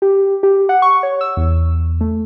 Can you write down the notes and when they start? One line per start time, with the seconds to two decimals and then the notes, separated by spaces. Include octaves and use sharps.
0.02 G4
0.43 G4
0.69 F#5
0.82 C#6
1.03 C#5
1.21 E6
1.37 E2
2.01 A3